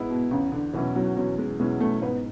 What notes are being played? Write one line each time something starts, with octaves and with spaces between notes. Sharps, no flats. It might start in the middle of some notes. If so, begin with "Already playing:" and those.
Already playing: G#2 G#3 B3 E4
B2
E2 C#3
D3
B2 E3 F#3 C#4 E4
F#3
E2 F#3
G#3
B2 F#3 G#3 C#4 E4
A3
G#2 B3